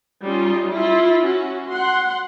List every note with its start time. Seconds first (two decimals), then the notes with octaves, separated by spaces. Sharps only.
0.23 G3 C#4 D#4 F4
0.72 E4 F4
1.24 C#4 F#4
1.71 F#5 C6